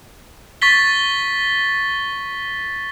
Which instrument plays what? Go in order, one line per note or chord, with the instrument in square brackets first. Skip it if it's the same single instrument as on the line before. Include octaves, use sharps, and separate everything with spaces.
[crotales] C#6 A6 B6 G7